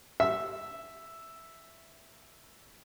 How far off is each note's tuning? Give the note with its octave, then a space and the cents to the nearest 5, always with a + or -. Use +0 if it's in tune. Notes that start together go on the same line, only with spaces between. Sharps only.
E5 +0 E6 +0